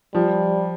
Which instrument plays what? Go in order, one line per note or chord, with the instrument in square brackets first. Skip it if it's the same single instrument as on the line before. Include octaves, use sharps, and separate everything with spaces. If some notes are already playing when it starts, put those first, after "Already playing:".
[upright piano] F3 [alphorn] G3